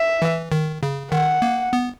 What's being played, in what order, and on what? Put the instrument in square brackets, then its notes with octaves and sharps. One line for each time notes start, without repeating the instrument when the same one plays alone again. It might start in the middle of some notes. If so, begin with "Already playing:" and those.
Already playing: [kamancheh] E5
[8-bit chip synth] E3
D#3
C#3
[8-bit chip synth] D#3 [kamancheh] F#5
[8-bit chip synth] A#3
B3